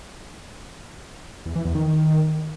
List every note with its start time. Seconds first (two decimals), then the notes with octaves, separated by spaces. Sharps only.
1.46 E2
1.56 E3
1.65 E2
1.75 D#3